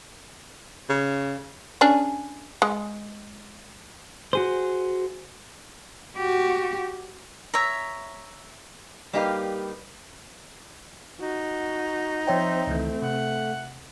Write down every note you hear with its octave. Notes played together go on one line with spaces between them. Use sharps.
C#3
C#4 D4 G#4
G#3
F#4 G#4 C5
F#4 G4
C#5 E5 A#5
G3 A#3 D#4 G4 B4 F5
D#4 F#4
F3 C4 C5 C#5 E5 G5
C#2 D#3 E3 A3
C3 F#5